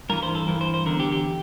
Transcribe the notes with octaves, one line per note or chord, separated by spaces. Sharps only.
G2 E3 A#4
C5
A4
G2 E3 A#4
C5
C5
E2 D3 A#4
G4
G4